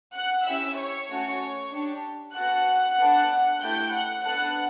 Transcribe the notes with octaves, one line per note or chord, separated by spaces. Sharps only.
F#5 F#6
C#4 E4 G4 E5 E6
C#5 C#6
A3 C#4 F#4 A4
D4 G4
B3 F#4 A4 F#5 F#6
B3 D4 A4
A3 E4 G4 G5 G6
F#5 F#6
B3 D4 A4 F#5 F#6